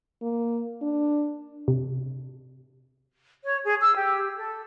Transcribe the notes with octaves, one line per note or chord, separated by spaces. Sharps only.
A#3
D4
C3
C#5
G#4
E6
G4
A4